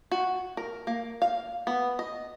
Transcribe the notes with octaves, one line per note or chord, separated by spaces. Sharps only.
F#4
A#4
A#3
F5
B3
D#5